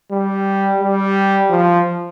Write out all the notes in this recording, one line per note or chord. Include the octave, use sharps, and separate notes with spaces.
G3
G3
F3